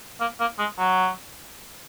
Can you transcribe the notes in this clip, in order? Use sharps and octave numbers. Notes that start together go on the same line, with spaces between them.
A#3
A#3
G#3
F#3